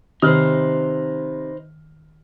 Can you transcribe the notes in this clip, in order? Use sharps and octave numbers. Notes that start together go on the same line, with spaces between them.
C3 D#3 D#4 B4 C5 F6